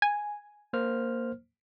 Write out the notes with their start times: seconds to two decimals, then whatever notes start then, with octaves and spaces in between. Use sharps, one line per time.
0.02 G#5
0.73 A#3 C5 F6